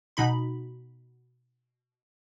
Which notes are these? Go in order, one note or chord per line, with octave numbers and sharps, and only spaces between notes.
B2 D#4 B5